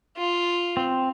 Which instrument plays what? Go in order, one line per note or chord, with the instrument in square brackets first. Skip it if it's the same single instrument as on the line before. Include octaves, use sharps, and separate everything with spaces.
[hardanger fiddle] F4
[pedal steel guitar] C4